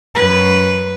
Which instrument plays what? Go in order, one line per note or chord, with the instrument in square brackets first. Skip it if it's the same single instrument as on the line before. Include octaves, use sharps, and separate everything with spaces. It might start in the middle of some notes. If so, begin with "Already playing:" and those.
[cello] F#2 B4